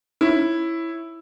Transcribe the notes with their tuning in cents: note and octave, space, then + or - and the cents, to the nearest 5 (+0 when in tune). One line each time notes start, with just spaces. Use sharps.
E4 +0 C#5 -20